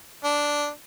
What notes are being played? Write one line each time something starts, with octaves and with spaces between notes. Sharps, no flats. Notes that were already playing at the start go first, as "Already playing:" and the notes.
D4